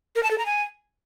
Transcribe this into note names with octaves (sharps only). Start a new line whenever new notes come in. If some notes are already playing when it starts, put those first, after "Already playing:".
A#4
A5
A4
A#5
G#5